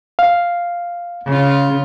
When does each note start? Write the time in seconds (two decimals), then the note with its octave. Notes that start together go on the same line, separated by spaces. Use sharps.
0.19 F5
1.28 C#3 F4